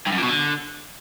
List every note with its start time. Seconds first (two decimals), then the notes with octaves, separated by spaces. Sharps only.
0.07 G2
0.12 F#2
0.18 A#2
0.23 B2
0.29 D3